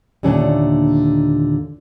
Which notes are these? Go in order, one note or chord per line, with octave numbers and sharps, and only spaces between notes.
D#2 A#2 D3 A3 C#4 D4